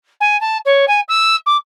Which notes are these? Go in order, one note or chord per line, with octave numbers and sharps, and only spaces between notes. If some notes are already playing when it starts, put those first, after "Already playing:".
G#5
A5
C#5
G#5
E6
D6